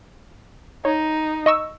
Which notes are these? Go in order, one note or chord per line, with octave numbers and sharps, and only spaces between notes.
D#4 C#5
D#5 C#6 E6